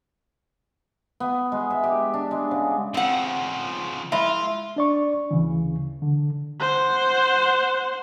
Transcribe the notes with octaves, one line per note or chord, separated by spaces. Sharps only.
B3
G#3
E5
G4
D4
G#3
C#3
C#3 F3 C4 F#5
G#3 A#3 E4 F4 E5
D4 D5 C#6
D2 C#3 E3
D3
C5 F#5